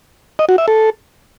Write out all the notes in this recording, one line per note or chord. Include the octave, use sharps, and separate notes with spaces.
D#5
F#4
E5
A4